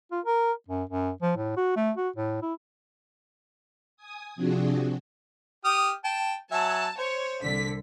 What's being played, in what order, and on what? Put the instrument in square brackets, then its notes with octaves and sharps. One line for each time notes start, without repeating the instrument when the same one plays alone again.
[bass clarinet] F4
A#4
F#2
F#2
F3
A2
F#4
A3
F#4
A2
E4
[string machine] G#5 D#6
C3 F3 C4 D4 F#4 G#4
[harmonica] G4 D#6 F6
G5 A5
[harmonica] F#3 E5 G#5 [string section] A5
[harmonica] C5 [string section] C#5
[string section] C2 D3 B6